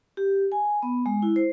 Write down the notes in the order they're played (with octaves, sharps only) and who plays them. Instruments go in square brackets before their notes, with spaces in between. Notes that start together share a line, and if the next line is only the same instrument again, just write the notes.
[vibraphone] G4
G#5
B3
G#3
E4
C5